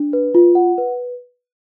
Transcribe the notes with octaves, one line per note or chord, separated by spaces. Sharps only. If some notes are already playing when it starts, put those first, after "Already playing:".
Already playing: D4
B4
F4
F#5
B4